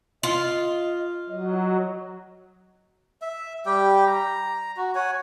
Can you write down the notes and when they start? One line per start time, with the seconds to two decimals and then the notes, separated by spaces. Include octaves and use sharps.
0.23 F4 D#5
1.29 F#3 D#5
3.22 E5
3.66 G3 G4 G5
4.07 A#5
4.77 F#4
4.95 C#5 F#5 G#5